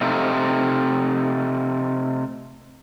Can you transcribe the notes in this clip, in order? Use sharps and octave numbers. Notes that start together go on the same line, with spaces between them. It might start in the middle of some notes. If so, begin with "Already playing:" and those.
C3 A3 D#4 F4